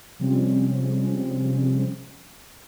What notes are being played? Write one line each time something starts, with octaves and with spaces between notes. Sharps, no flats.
C3 F3 G3 G#3 C4 C#4